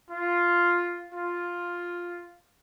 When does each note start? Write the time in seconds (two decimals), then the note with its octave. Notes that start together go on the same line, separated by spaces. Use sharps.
0.11 F4
1.13 F4